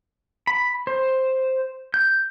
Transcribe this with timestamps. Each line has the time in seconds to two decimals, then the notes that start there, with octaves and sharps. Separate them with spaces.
0.47 B5
0.87 C5
1.94 G6